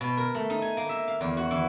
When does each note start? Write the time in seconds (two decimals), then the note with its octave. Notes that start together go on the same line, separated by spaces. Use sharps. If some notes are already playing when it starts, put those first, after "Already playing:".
0.01 B2
0.17 A#4
0.35 A3
0.50 D#4
0.62 G#5
0.77 A#3
0.89 E5
1.08 F5
1.21 E2
1.37 F#4
1.51 E3